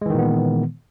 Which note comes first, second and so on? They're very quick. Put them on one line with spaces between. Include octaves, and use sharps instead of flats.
G#3 E3 D#3 A#2 B3